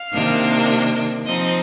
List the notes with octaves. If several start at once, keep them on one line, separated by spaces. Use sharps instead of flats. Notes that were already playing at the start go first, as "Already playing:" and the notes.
Already playing: F5
C3 D#3 A#3 D4
F3 C4 D#4 D#5